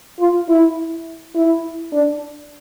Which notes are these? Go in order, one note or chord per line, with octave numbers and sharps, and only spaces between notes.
F4
E4
E4
D4